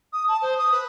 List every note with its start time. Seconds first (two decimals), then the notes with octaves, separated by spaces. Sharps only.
0.13 D#6
0.28 A5
0.42 C5
0.58 D#6
0.72 B4